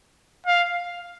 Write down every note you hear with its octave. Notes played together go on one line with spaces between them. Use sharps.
F5